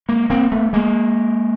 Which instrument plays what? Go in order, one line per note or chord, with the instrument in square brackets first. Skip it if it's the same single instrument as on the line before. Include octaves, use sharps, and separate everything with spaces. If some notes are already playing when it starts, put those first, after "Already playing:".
[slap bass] G#3 A#3
A#3 C4
A3 B3
G#3 A#3